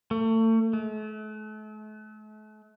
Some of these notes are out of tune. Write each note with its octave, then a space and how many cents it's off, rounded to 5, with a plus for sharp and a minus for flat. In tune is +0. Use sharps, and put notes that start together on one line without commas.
A3 +35
A3 -40